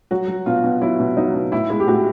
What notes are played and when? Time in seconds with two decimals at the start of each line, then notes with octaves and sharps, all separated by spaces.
0.11 F#3 F#4
0.28 F#3
0.46 B2 F4
0.64 B2
0.82 F#3 E4
1.00 B2
1.17 F#3 D#4
1.34 B2
1.52 A2 E4
1.70 G#3 E4
1.80 G4
1.87 A2 F#4